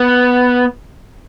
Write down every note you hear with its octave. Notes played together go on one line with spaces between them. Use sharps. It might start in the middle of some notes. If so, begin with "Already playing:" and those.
Already playing: B3